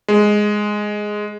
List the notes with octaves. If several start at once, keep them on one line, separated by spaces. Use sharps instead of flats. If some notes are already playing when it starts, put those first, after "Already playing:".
G#3